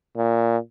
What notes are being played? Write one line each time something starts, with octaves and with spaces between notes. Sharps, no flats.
A#2